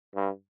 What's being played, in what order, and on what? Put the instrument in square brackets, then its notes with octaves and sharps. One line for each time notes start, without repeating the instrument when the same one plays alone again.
[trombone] G2